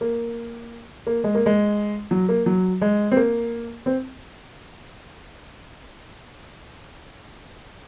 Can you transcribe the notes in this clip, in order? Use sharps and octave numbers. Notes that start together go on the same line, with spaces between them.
A#3
A#3
G#3
A#3
G#3
F#3
A#3
F#3
G#3
C4
A#3
C4